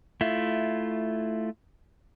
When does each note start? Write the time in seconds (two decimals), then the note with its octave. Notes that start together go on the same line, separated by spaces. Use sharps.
0.21 A3 E4 F4